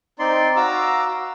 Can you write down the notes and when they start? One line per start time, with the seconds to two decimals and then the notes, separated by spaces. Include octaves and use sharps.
0.19 C4 D#4 D5 C6
0.56 F#4 F5 A#5 D6 E6